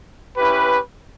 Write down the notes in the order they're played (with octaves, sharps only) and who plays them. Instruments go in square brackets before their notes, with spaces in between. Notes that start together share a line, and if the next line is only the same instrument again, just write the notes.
[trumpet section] C#4 E4 G4 B4